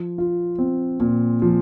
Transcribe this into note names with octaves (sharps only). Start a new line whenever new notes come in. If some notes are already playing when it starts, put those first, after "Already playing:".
Already playing: F3
F4
C4
A#2
F3